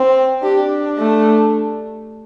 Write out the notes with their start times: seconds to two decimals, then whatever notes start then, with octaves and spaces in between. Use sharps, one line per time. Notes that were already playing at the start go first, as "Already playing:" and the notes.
Already playing: C4
0.43 D4 G4
0.99 A3